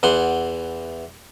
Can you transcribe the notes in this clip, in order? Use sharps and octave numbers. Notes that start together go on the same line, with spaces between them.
E2 E3 F#5 C6